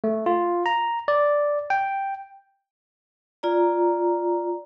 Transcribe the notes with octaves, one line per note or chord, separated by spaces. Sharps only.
A3
F4
A#5
D5
G5
F4 D5 A#5